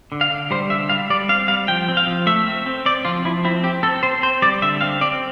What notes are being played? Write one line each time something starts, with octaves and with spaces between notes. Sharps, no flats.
D3
F5
D3
G3 C5
D3 E5
G3 F5
G3 D5
C4 F5
G3 F5
F3 G5
C4
F5
F3
A3 E5
C4
C4
C4 D5
F3 F4
F3 E4
C4 E4
C4 G4
C4 A4
C4 C5
C4 C5
G3 D5
D3 E5
C4 F5
C4 D5